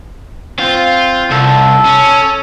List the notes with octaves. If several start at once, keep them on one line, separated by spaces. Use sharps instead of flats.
C4 F4 C5
C2 A4
C#4